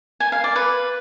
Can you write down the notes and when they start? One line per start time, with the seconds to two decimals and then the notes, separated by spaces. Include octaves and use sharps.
0.20 G#5
0.32 F5
0.44 D5
0.56 B4